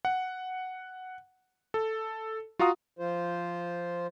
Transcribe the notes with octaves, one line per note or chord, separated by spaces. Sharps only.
F#5
A4
F4 F#4 F5 A#5 D#6
F3 F4 C5